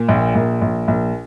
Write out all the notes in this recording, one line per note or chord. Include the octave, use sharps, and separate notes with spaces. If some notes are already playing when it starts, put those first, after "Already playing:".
Already playing: A#2
A#1
A#1
A#1
A#1